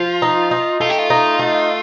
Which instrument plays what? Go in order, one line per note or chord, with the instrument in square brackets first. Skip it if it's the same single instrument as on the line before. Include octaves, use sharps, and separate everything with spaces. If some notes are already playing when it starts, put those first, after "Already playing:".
Already playing: [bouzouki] F3 [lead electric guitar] F4
[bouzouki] D#4
D#4
[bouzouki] A3 [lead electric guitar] F4
[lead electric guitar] G4
F4
[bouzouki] D#4
A3